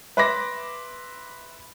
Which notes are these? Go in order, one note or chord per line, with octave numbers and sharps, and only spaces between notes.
B4 E5 B5 C6 D6 A#6